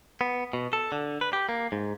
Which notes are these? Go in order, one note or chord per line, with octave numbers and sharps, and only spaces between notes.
B3
B2
A4
D3
B4
G4
A#3
G#2